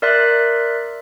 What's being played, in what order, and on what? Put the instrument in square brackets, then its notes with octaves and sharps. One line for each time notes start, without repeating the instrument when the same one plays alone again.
[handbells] A#4 D5 E5 C6 F#6